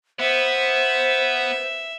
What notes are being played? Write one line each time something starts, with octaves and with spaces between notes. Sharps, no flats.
B3 C5 E5